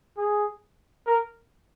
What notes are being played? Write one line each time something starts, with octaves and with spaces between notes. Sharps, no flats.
G#4
A#4